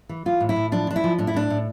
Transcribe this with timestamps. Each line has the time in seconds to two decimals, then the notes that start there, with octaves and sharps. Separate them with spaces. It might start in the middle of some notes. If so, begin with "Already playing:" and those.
0.09 E3
0.26 E3 F4
0.40 A2
0.49 E4
0.56 A2
0.72 F3 D4
0.87 F3 D4
0.96 E4
1.04 F3
1.18 A2 D4
1.27 E4
1.34 A2 D4
1.50 A2